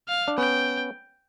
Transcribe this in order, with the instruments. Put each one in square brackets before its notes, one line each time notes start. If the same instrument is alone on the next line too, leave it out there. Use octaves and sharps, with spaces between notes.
[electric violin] F5
[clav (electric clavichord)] D4
[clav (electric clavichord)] B3 C#4 [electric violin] G5